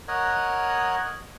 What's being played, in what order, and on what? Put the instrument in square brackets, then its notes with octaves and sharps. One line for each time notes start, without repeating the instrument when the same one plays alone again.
[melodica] A#4 C#5 D#5 F#5